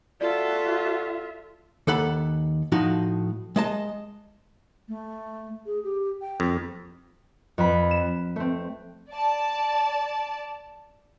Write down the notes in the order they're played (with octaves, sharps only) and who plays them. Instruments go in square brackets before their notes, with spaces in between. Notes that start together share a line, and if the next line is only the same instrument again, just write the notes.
[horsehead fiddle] F4 E5 [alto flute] F#4 [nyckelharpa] A4 [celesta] D5
[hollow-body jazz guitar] D#2 A4 F#5 B5
A2 F3 D#4 F#4
G#3 D#5 A5
[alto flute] A3
G#4
G4
G5
[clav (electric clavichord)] F2
[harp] F2 B5
E7
A3 C4
[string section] D5 A5